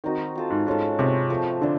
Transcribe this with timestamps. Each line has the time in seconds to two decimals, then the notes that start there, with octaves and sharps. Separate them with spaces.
0.04 D#3 C4 D#4 F#4
0.35 C4 F4 A4
0.50 G#2
0.67 G#2 G#3 C#4 F4 A4
0.98 C3 C4 F4 G#4 C#5
1.30 F3 A3 C4
1.61 D3 A3 D4